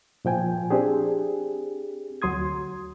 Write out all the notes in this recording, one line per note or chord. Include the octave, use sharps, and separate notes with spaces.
A#2 F3 G5 G#5
C4 D4 G4 G#4
D2 F#3 C6 D#6 G#6